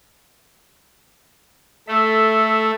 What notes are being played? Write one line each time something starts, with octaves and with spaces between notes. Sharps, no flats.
A3 A4 E5